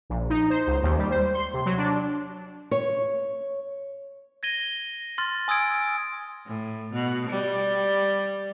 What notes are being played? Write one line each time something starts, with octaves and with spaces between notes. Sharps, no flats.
A#1
D#4
C5
C#2
D#2
G3
C5
C6
C3
F#3
D4
C#5
G#6 A#6 D#7 G7
C6 F6 A6
G#5 D#6 E6 G#6 D7
A2
B2
G3